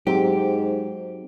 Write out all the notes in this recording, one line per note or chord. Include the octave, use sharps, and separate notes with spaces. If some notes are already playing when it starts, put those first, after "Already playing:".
G#2 F#3 C4 G4